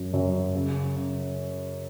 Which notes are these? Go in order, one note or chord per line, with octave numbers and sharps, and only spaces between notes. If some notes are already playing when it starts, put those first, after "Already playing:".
Already playing: F#2
F#2
C#3
C#3